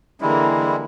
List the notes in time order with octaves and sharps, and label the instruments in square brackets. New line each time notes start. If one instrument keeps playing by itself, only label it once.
[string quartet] D3 E3 A#3 [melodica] G3 G#3 E4